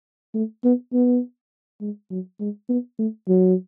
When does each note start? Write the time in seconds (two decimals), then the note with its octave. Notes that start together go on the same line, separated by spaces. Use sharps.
0.34 A3
0.64 B3
0.93 B3
1.81 G#3
2.10 F#3
2.40 G#3
2.69 B3
2.99 A3
3.28 F#3